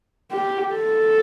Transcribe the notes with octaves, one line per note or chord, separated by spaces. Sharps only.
G4
A4